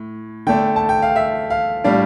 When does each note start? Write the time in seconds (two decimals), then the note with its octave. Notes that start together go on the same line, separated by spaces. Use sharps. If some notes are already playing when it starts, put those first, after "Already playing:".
Already playing: A2
0.47 D3 A3 D4 G5
0.76 A5
0.89 G5
1.02 F5
1.16 E5
1.50 F5
1.84 A2 G3 D4 F5